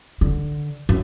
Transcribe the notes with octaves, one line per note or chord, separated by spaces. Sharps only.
D3
F#2